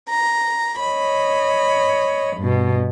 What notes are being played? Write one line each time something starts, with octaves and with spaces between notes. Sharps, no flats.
A#5
C#5 D#5 B5
G2 B2